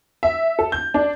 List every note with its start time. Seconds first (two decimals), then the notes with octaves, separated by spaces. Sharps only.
0.23 E5
0.59 A4
0.72 G6
0.94 D4